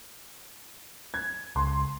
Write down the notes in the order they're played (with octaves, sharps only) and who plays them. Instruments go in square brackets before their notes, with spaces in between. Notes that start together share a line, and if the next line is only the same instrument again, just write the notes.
[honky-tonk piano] G#6
[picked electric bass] C#2 [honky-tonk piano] C6